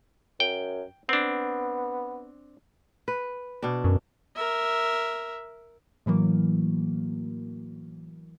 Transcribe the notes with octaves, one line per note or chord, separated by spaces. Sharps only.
F#2 G5
B3 C4 D4
B4
B2 D4
F#2
A#4 E5
A2 E3 F#3 A#3